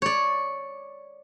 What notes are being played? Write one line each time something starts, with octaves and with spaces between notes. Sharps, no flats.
C#5 D5